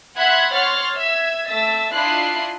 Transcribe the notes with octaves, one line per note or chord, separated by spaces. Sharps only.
E5 F#5 B5 C6 F#6 G#6
C#5 F#5 C6 F6 A6
E5 E6 G#6
A3 E5 E6 A6
D4 E4 F4 D#5 F#6 C7